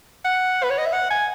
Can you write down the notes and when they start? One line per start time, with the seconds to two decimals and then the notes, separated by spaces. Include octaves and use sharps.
0.25 F#5
0.64 B4
0.71 C#5
0.78 D#5
0.86 E5
0.93 F#5
1.10 G#5